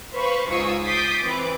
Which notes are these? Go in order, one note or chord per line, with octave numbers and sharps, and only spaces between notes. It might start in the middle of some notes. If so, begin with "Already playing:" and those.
B4 C5 F5 B5 C#6
C#2 G#2 F4 C#6 D#6 E6
D6 D#6 G6 A6 B6 C7
E3 C4 B4 D6